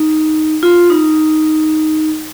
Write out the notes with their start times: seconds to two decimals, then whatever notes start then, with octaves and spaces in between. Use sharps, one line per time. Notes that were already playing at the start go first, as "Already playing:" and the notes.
Already playing: D#4
0.63 F4
0.90 D#4